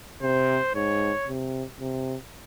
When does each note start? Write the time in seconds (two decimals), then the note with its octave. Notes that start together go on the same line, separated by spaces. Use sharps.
0.22 C3 C5
0.75 G#2 C#5
1.28 C3
1.80 C3